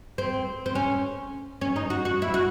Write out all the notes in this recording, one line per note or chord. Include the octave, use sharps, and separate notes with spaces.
C4
C4
C#4
C#4
D#4
F#4
F#4
E4
F#4